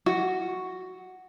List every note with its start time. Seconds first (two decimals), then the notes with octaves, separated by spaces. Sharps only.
0.06 F#4